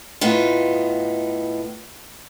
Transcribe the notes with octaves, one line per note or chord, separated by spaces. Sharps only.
A2 B3 D#4 F4